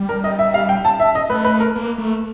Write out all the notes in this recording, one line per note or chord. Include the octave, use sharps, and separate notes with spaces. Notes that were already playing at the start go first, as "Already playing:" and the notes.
Already playing: G3
A#4
D#5
E5
F5
G5
A5
E5
D#5
A3 B4
B4
A#4
A#3
A3